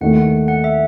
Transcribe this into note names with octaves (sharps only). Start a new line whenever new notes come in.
D#2 D#3 A3 E4 F#5
F#5
F#5
E5